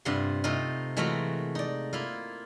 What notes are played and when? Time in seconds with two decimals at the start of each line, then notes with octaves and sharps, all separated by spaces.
0.05 G2 C3 F4 F#5 C6
0.44 C3 A3 D#4 F4
0.97 E3 G#3 A3 F4 F#4 A#4
1.55 D#4 D5
1.93 A#3 E4 F4